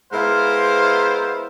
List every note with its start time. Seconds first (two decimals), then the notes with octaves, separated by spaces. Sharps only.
0.12 G#3 B3 E4 A#4 C5 F5